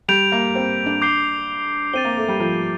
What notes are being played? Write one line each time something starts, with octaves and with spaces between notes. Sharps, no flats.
G3 G6 D7 F7
A#3
C4
D4
D6 G6 C7 G7
C4 A6 D#7 G7
A#3
A3
G3
F3